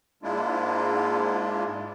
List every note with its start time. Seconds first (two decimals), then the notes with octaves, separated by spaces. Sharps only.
0.23 G#2 G#3 A#3 D4 E4 F4